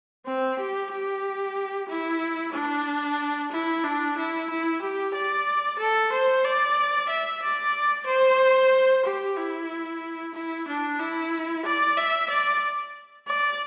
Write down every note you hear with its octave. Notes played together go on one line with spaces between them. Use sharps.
C4
G4
G4
E4
D4
E4
D4
E4
E4
G4
D5
A4
C5
D5
E5
D5
C5
G4
E4
E4
D4
E4
D5
E5
D5
D5